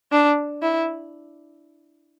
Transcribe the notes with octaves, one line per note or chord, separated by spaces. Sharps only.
D4
E4